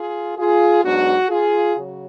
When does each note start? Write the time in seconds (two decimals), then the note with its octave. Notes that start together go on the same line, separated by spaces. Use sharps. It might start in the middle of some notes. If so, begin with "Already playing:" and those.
Already playing: F4 G#4
0.37 F4 G#4
0.83 G#2 F#3 B3 D4 F#4
1.29 F4 G#4
1.75 C#3 F#3 F#4